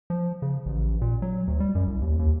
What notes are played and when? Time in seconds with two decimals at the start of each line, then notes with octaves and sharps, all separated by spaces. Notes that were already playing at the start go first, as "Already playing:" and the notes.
0.10 F3
0.42 C#3
0.66 A1
1.01 A#2
1.22 F#3
1.47 D2
1.60 G3
1.75 F#2
1.87 C2
2.01 D#2
2.19 D#2